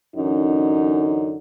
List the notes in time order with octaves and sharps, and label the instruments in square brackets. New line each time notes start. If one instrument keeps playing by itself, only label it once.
[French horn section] F#2 D3 E3 C#4 D#4